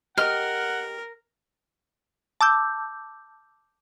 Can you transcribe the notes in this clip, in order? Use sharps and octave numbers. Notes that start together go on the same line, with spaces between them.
G4 A#4 D#5 F#5 F6
A5 D6 E6 G6